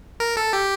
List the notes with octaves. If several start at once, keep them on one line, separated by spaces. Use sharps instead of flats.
A#4
A4
G4